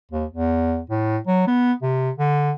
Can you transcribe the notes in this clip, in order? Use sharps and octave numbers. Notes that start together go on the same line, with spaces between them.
D#2
E2
A2
F#3
B3
C3
D3